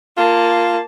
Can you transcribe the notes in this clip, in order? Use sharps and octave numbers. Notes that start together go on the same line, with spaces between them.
A#3 F4 A5